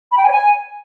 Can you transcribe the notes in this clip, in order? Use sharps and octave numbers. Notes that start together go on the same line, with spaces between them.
B5
G5
G#5
C#5
G#5